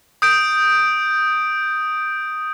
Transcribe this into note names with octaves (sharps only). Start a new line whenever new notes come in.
D#6 G6 D7